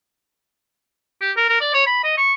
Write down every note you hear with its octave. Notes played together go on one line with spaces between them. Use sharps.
G4
A#4
A#4
D5
C#5
B5
D#5
C#6